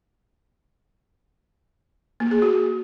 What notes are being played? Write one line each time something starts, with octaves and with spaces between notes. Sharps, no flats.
A#3
G#4
F#4